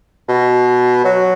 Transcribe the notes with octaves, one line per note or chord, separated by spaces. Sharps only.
B2
F#3